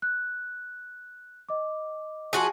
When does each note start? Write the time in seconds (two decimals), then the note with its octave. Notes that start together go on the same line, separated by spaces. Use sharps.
0.02 F#6
1.49 D#5 D6
2.33 F3 F#4 G#4